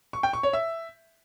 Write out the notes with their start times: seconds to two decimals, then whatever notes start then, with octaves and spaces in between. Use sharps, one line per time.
0.13 C#6
0.23 G5
0.33 C#6
0.43 C#5
0.53 E5